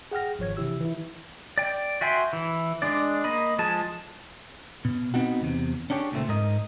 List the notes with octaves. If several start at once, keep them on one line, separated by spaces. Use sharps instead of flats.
G#4 F#5 G5 F6 A#6
G#1 F3 C#5 G#6
C3 E3 E4 G4 E6
E3 E4
D5 G5
F#4 E5 G5 G#5 C6
E3
G#3 D4 D5
A#3 D#5 B5
F3 G#3 G#4 A5
B2
B2 B3 C4 D#4 F#4
E2 C3
C#4 D4 G4 G#4 C#5
C#2 A#2 A3 C4
G#2 A#4 D#5